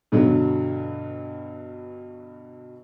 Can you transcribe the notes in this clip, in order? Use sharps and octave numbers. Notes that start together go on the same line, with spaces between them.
G2 B2 D3 F#3